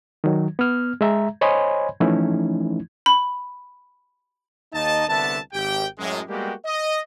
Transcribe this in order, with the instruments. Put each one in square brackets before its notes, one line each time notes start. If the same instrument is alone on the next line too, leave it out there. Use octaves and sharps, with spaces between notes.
[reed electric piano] D#3 F#3
B3 F6
G#3 E5 A#5
C5 C#5 D#5 G#5 B5 C6
E3 F3 A3 C#4 D#4 E4
[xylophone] B5
[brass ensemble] D#2 D#4 D#5 A5
C2 D3 B3 E5 A5
G#1 G4 G5
F#2 A2 G#3
G3 G#3 A#3 B3 F#4 G4
D#5